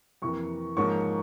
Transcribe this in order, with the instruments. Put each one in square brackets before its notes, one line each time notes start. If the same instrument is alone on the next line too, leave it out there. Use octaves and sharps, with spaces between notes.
[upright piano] F2 C3 E3 A#3 C#6
G#2 F3 A#3 C#4 C#6